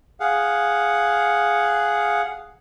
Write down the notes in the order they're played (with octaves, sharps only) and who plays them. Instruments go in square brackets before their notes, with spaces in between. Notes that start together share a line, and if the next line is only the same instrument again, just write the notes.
[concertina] G#4 F5 F#5